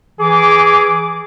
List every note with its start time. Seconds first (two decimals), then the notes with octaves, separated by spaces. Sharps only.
0.20 E3 G#4 D6